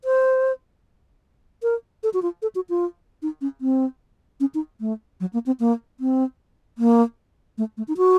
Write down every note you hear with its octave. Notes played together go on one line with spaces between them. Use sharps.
C5
A#4
A4
F#4
F4
A4
F#4
F4
D#4
C#4
C4
C#4
D#4
A3
F#3
A#3
C4
A#3
C4
A#3
A3
A3
D#4
F#4